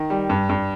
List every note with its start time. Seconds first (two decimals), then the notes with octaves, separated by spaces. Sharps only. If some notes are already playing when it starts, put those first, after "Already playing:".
Already playing: D#3
0.10 G3
0.30 G2
0.49 G2